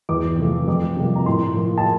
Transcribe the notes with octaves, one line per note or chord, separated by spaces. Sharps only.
E2 D6
C3 F3 A3
F2 D6
C3 G3 A#3
A#5
A2 C6
F3 A#3
A5